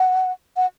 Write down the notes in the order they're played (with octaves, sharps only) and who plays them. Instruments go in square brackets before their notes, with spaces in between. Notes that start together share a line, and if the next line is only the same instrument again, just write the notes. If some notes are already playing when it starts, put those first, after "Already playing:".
Already playing: [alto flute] F#5
F#5